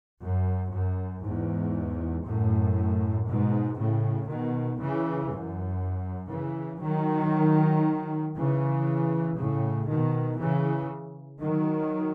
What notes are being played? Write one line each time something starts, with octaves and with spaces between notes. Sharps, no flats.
F#2
F#2
E2 G#2
F#2 A2
G#2 B2
A2 C#3
B2 D#3
C#3 E3
F#2
C#3 E3
D#3 F#3
C#3 E3
A2 C#3
B2 D#3
C#3 E3
D#3 F#3